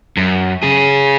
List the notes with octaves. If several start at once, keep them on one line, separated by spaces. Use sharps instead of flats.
F#2
C#3 G#4